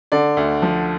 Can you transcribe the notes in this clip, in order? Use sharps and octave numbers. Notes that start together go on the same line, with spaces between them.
D3 D5
D2
F3